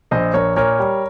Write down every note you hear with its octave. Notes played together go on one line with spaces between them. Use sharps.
A#1 C5 D#5
A#1 A#4 C#5
A#2 A#4 C#5
G3